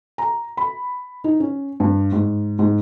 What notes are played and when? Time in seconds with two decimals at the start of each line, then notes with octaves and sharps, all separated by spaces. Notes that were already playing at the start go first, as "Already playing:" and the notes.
0.18 A#5
0.57 B5
1.24 D#4
1.40 C#4
1.80 G2
2.12 G#2
2.59 G#2